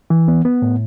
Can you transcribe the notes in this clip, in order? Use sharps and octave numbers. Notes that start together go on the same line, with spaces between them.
E3
B3
B3
A2